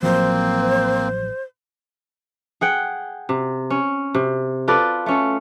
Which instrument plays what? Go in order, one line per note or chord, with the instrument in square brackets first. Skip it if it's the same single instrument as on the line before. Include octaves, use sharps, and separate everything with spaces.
[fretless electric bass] A1 F3 F#3 [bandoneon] A#3 C4 [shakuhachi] C5
[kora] G#4 F#5 G5
C3
C#4
C3
F4 A4 B4 D5
A3 C#4 A4